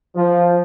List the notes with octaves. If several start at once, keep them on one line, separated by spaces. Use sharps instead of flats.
F3